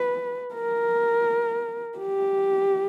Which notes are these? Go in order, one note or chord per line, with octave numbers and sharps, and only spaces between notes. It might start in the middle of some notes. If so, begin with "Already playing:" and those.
Already playing: B4
A#4
G4